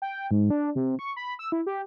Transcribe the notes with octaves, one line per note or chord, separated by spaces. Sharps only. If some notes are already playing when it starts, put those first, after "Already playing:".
G5
G#2
D4
C3
C#6
B5
E6
E4
G4